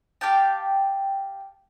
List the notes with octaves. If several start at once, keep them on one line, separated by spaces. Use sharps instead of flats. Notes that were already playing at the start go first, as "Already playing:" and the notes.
G4 F5 G5 A5